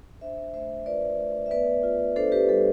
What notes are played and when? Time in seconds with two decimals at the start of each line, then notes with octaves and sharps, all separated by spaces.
0.21 D4 C5 E5
0.53 A3 C5 E5
0.86 F4 B4 D5
1.18 A3
1.46 E5
1.51 B3 B4 D5
1.83 F4
2.16 D4 A4 C5
2.32 G4 B4
2.49 G3 A4